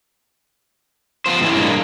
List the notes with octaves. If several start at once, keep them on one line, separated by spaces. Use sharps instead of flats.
B3 F4 C5
A2 E3 C#4
G2 G#3 A#3